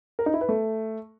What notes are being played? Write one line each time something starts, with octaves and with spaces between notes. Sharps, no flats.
A#4
D#4
E4
B4
A3